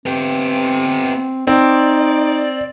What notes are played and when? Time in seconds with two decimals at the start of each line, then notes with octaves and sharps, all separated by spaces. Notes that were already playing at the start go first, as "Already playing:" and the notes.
0.06 B3 C4 G4
1.47 C4 D#4 D5